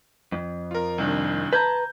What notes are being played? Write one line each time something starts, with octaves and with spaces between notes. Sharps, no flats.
F2
F4 A#4
C2 D#3 D4
B4 A5 A#5 G6 G#6